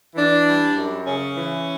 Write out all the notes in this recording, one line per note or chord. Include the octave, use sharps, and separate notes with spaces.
E3 D4
G3
F#2
C#3 C#4
E3